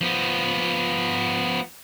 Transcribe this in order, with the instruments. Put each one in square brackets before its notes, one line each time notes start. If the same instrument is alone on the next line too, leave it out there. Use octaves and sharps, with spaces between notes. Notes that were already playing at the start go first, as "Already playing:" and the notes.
[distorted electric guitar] F3 B3